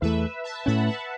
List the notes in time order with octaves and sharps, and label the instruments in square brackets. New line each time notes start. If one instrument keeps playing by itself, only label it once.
[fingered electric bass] E2 E3 A3 [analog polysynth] B4 E5
[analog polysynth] E5 A5
[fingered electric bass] A2 A3 C#4 [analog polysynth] F#5 B5
[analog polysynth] E5 A5